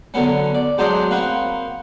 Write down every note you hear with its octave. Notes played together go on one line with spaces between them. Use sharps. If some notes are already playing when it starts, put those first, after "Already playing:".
D3 F#3 B3 C#4
D5
G#2 F#3 D4 C5 D5 D#6
A#3 C4 B4 F#5 C#6